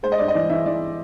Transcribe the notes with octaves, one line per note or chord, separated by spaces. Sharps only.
G#3 C5
D#5
G2 D5
D#5
E3 D5
E3 E5
E3 D5